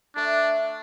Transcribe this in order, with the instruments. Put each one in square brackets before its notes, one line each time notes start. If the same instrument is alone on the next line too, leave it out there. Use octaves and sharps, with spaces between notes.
[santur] A3 [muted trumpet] D4